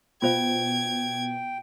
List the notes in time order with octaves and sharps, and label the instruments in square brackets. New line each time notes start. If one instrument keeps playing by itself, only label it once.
[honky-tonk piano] B2 [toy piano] F4 C5 F5 [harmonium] G5 [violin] G#6